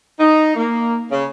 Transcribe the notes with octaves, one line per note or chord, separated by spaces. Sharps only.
D#4
A#3
C#3